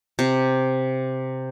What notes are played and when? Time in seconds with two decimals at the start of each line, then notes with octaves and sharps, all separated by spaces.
0.19 C3